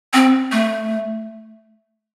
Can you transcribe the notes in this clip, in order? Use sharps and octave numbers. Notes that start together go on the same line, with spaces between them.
C4
A3